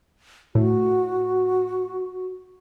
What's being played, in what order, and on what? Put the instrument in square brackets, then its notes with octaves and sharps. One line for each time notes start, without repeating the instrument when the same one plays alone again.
[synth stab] A2 [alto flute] F#4